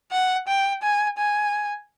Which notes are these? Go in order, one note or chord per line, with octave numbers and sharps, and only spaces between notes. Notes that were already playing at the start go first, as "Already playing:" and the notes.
F#5
G5
G#5
G#5